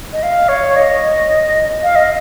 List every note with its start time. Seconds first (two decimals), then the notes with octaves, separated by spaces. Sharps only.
0.13 D#5
0.23 F5
0.49 C#5
0.76 D#5
1.83 F5
1.96 D#5